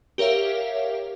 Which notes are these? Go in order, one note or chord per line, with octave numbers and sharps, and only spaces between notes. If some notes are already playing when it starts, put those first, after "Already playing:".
G4 A#4 C#5 E5 F5